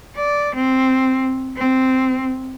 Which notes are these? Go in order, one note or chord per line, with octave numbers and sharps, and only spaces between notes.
D5
C4
C4